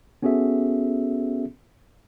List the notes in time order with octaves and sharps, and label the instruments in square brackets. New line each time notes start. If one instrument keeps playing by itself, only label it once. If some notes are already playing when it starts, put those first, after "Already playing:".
[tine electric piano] B3 C#4 F#4 G#4 A4 E5